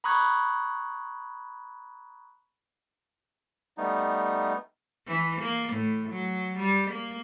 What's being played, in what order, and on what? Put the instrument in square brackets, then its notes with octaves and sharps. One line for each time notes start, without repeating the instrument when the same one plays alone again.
[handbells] A#5 B5 C#6 D#6 F#6 G#6
[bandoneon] G3 A3 B3 D#4
[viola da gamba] E3
A#3
A2
F#3
G3
A#3